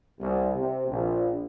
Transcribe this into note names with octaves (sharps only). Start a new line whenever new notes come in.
C2
C3
A#1